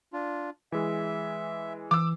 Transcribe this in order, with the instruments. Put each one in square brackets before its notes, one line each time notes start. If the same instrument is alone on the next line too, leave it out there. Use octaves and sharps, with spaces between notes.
[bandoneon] D4 F4
[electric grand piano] E3 G#3 [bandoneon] E5
[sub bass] E3 [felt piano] D6 E6